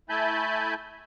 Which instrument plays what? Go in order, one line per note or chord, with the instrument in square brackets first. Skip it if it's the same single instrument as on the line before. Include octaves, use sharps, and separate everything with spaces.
[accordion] A3 E4 G#5 A5 B5 G6